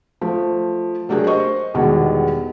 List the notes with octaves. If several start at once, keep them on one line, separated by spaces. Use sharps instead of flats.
F3 A3
F#3 A3 D4 G4 G#4 A#4
C5 D#5 C#6
E2 B2 D#3 G3 G#3